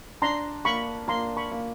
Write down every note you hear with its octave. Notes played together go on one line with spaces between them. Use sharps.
D4 A#5 C6
A#3 B5 C#6
A#3 A#5 C6
B5 C#6
A#3